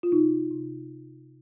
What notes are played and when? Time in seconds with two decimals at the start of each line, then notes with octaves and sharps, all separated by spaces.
0.03 F4
0.12 C3 D#4
0.51 C3